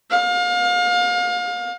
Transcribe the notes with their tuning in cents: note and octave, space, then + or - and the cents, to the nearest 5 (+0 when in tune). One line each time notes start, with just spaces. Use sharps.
F5 +35